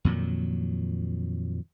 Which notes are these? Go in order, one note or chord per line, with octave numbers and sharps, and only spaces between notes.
F2 A#2 D#3 F#3